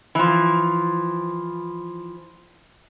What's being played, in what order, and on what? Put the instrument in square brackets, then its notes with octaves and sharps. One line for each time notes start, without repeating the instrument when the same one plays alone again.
[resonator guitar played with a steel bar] E3 F3